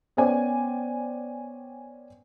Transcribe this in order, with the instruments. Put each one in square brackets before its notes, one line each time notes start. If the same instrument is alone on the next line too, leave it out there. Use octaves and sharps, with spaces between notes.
[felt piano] B3 C#4 C5 D5 G5 G#5